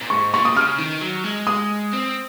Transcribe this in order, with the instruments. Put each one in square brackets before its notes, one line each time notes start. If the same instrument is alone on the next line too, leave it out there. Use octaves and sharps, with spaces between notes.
[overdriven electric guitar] A#2
[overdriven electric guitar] G#2 [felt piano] C#6
[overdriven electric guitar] A#2 [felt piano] C#6
[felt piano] D#6
[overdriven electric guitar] C#3 [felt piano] F6
[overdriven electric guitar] D#3
F#3
G#3
[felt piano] D#6
[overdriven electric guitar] C4